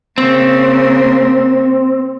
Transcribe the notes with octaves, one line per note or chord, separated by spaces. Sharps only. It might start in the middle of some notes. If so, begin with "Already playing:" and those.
C#3 A#3 C4